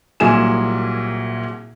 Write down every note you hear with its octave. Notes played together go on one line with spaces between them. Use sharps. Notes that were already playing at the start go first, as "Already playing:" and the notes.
C2 A#2 F#3 G#4 G#5 E7